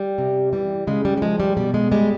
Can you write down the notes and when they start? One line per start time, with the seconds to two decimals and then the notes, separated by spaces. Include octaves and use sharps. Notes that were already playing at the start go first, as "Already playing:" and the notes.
Already playing: G3
0.18 C3
0.53 E3 G3
0.87 C#3 G#3
1.05 G3
1.17 G3
1.22 F3 G#3
1.40 G3
1.57 B2 G3
1.74 G#3
1.92 G3 G#3